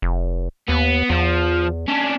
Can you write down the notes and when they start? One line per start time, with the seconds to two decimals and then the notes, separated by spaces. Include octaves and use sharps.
0.02 F1
0.69 D#2 B3
1.10 E2 F3
1.88 C#4 D4